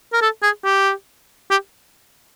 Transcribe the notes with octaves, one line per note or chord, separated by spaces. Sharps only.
A#4
A4
G#4
G4
G4